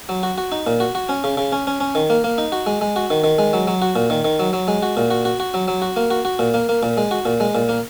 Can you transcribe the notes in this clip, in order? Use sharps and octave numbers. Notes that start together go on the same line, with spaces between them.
F#3
F#4
F#4
D#4
A#2
F#4
F#4
C#4
C#3
C#3
C#4
C#4
C#4
D#3
A#3
A#3
D#4
F#4
G#3
G#3
F#4
D#3
D#3
G#3
F#3
F#3
F#4
A#2
D#3
D#3
F#3
F#3
G#3
F#4
A#2
F#4
F#4
F#4
F#3
F#3
F#4
A#3
F#4
F#4
A#2
A#3
A#3
A#2
G#3
F#4
A#2
G#3
A#2
A#3